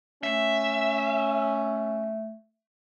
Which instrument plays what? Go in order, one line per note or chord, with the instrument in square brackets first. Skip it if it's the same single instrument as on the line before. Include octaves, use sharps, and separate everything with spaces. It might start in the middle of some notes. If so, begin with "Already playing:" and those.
[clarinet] A3 [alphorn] C#4 [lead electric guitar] E5